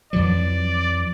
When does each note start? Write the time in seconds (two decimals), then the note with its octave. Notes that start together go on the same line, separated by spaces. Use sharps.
0.13 F2 E3 F#3 D5